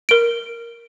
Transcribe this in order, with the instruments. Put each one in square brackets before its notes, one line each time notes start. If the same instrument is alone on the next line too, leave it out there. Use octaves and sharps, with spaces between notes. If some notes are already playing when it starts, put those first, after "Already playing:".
[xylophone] A#4 D7